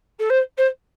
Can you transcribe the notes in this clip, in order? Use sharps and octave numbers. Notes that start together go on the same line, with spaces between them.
A4
C5
C5